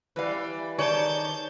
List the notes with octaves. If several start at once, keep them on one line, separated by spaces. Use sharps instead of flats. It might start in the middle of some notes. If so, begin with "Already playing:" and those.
E3 G3 B4 F5
D#3 G#4 C#5 D5 A5 G6 A6